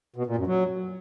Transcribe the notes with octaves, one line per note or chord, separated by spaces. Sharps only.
B2
A#2
F#2
F#3